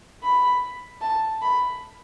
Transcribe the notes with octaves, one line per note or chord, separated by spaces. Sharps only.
B5
A5
B5